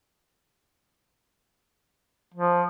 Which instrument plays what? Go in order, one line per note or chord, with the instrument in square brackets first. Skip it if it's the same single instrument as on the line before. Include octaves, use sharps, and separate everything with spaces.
[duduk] F3